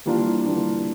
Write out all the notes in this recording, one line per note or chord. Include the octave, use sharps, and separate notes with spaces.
E3 G3 A#3 D4 F4
E3 G3 A#3 D4 F4